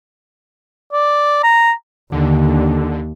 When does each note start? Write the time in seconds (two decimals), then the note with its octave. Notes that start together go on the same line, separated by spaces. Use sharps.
0.93 D5
1.43 A#5
2.12 D#2 D3